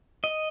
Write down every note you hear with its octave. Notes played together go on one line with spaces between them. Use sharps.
D#5